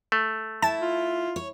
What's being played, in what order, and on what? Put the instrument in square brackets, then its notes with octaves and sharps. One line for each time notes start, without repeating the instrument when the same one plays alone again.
[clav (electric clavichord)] A3
[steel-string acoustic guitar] E4 [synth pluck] A5 A6
[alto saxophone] F4
[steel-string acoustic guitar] C#5